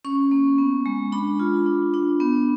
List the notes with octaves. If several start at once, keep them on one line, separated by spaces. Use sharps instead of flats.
C#4 C#6
A#3
B3
G#3
D4 B5
F4
D4
D4
B3